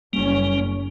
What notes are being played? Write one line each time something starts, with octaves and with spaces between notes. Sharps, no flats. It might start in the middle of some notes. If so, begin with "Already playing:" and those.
F#1 G3 A#3 C#4